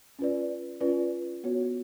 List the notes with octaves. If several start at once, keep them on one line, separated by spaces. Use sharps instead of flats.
C#4 F4 B4 D5
C#4 F4 B4 D5
B3 F#4 C#5